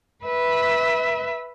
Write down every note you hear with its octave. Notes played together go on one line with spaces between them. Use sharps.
B4 E5